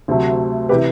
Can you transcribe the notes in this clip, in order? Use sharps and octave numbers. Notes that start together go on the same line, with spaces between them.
D2 C3 F#3 A3
C3 E3 G4 B4